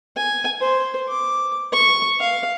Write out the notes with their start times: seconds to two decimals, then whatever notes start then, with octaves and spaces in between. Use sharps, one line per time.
0.16 G#5
0.61 C5
1.09 D6
1.73 C#6
2.20 F5